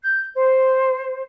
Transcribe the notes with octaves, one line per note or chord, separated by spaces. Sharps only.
G6
C5